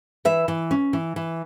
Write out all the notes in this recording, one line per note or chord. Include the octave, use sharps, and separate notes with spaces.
E3 E5
E3
C#4
E3
E3